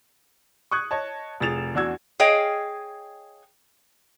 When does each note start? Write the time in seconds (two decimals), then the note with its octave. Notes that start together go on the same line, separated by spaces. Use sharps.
0.71 C#6 D#6 F#6 G#6
0.91 C#5 D#5 A5
1.40 F1 F3 G#4 A6 E7 F7
1.75 E2 D4 F#4 E6 G#6
2.20 G#4 C#5 D#5 F5 G5